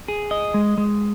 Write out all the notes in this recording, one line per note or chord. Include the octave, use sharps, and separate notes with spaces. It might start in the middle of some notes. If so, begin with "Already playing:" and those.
G#4
D#5
G#3
G#3